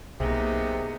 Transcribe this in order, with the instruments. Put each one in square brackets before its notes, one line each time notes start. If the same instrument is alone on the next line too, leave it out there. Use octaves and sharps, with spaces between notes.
[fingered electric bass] B1 [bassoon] C3 [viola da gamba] A#3 B3 D#4 [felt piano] G#4